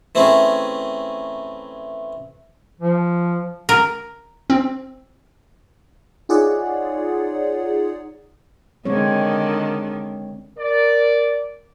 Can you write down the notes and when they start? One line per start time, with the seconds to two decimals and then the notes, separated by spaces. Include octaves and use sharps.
0.15 E3 A3 C4 C#4 G#4
2.81 F3
3.69 A#4
4.50 C4
6.29 D#4 F4 G#4 C#5 D5 F#5
8.85 D3 D#3 G#3 C4 C#5
10.58 A#4 D5